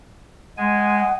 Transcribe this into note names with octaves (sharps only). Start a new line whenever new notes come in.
G#3 F#5 G#5